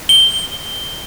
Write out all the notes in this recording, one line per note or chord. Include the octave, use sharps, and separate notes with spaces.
G7